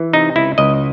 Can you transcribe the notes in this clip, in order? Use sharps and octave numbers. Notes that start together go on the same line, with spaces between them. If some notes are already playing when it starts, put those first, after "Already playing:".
Already playing: E3
C3 D#4
C#2 E4
C#2 D#5